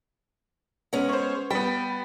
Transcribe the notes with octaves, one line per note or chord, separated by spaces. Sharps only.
G#3 B3 C#4
C5 C#5
G3 B3 G5